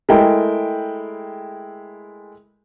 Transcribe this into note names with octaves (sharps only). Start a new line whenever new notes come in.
G#3 A3 E4 A#4 G5